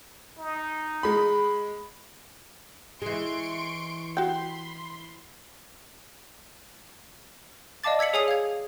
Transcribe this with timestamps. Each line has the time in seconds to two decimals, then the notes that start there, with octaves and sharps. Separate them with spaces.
0.38 D#4
1.03 G#3 B5
3.02 E3 G#3 C6 C#6 D7
4.17 F#4 G5 B5 C6
7.84 D5 D#5 F5 A5 D6 A6
7.99 E6 G#6 B6 C#7 F#7
8.13 G#4 C#5 G#5 D#6 C7 F7
8.28 F5 G#6